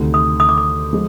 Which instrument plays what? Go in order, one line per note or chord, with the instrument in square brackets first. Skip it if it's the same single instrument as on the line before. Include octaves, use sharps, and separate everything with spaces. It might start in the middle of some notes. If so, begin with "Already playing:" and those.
Already playing: [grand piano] D2 C3 D#3
[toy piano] D#6
D#6
D6
D#6
[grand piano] F3 G#3